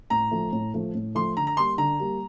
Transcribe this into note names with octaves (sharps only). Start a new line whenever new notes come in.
A2 A#5
F3 A3
A2
F3 A3
A2
F3 A3 C6
D3 A#5
A#5
G3 A#3 C6
D3 A#5
G3 A#3